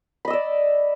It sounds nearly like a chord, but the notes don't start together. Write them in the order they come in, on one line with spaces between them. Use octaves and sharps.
B5 D#5 E6 D5